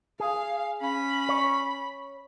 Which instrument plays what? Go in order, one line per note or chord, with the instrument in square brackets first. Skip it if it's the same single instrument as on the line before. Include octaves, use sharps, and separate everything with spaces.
[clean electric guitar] G#4 [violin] F5
[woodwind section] C#4 [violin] B5
[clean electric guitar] C#5